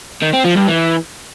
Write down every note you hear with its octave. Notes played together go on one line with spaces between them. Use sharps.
D#3
C4
F3
G2
E3